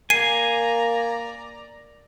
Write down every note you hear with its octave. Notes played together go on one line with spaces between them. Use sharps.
A#3 D5 G#5 A#5 C7 D#7